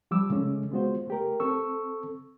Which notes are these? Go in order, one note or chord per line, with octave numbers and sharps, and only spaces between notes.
F3 G3 D6 E6
C#3 G#3 A3 C#4
G#3 B3 F4 F#4 C5
A3 G4 A#4
C4 A4 C#6 E6